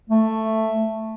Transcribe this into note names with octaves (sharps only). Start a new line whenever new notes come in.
A3